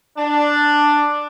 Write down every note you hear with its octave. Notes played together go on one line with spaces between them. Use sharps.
D4